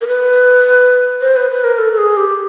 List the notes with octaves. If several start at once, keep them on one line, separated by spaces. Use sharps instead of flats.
A#4
B4
C5
B4
B4
A#4
A4
A4
G#4
G4